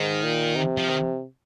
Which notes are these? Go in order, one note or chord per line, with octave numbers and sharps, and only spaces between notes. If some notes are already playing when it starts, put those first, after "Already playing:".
Already playing: G#2 D#3
A#2
C3
F3
D#3